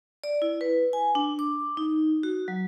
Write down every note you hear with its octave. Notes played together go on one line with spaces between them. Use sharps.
D5
E4
B4
G#5
D4
D6
D#4
F#4
F#3